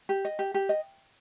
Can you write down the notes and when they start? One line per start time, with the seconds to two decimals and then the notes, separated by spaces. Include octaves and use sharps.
0.09 G4
0.25 D#5
0.39 G4
0.54 G4
0.69 D#5